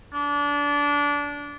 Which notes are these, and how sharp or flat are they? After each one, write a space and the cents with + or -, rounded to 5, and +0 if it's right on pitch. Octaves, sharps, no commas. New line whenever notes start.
D4 -25